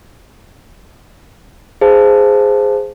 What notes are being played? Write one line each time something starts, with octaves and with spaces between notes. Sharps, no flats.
G#4 C5 F5 A5